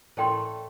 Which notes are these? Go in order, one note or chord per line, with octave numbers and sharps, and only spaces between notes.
A2 A3 A#4 D5 G5 C6